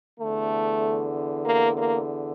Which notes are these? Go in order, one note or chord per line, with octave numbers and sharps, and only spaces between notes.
E2 D3 A3
A#3
A#3